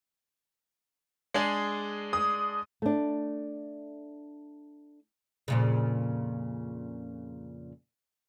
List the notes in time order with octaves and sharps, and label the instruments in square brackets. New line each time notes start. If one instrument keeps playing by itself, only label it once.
[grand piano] G#3 D4 G#4
[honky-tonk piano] D#6
[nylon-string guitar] A3 D4
[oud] F2 A#2 C#3